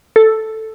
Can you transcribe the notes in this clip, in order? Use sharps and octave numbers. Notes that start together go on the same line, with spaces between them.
A4